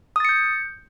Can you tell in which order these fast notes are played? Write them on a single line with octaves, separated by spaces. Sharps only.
D#6 A6 C#7 G6